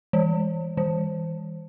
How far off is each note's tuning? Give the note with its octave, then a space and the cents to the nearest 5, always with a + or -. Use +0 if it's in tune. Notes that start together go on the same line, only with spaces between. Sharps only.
E3 +5
E3 -35